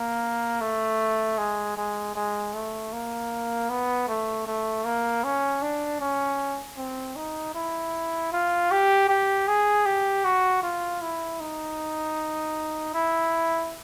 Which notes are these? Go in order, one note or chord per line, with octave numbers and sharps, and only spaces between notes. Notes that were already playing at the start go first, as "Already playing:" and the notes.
Already playing: A#3
A3
G#3
G#3
G#3
A3
A#3
B3
A3
A3
A#3
C#4
D4
C#4
C4
D#4
E4
F4
G4
G4
G#4
G4
F#4
F4
E4
D#4
E4